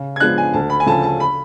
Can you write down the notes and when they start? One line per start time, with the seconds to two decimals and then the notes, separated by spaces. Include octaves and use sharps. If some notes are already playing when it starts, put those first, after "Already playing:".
Already playing: C#3
0.16 G#6
0.20 F3 G#3 B3 D4 F#6
0.38 G#5
0.53 D2 A5
0.70 B5
0.80 G#5
0.86 C#3 F3 A3 A5
1.03 A5
1.20 B5